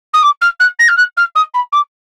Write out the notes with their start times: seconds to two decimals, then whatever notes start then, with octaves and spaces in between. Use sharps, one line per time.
0.13 D#6
0.22 D6
0.41 F6
0.59 F#6
0.79 A#6
0.88 F6
0.97 F#6
1.17 F6
1.35 D#6
1.54 B5
1.72 D6